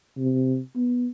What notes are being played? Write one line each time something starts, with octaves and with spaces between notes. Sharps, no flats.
C3
B3